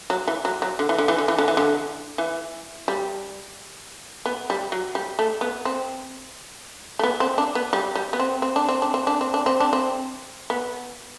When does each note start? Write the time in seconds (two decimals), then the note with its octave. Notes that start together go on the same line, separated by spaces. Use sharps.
0.10 F#3
0.28 E3
0.45 F#3
0.62 F#3
0.79 D3
0.89 E3
0.98 D3
1.08 E3
1.18 D3
1.28 E3
1.38 D3
1.48 E3
1.57 D3
2.18 E3
2.88 G3
4.26 B3
4.50 G3
4.72 F#3
4.95 G3
5.19 A3
5.41 B3
5.65 C4
6.99 A3
7.03 B3
7.20 C4
7.38 D4
7.55 B3
7.73 G3
7.95 G3
8.13 B3
8.20 C4
8.42 C4
8.56 D4
8.69 C4
8.82 D4
8.94 C4
9.07 D4
9.21 C4
9.34 D4
9.46 C4
9.60 D4
9.73 C4
10.50 B3